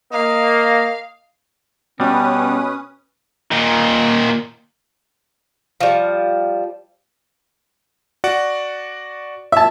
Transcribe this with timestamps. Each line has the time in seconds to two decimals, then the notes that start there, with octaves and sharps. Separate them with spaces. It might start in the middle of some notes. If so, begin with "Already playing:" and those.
0.13 A#3 D#5 F5
2.00 B2 G3 C#4 B4 D#6
3.52 A#2 D#3
5.80 F3 G3
8.24 F#4 D5 F#5
9.52 E5 A5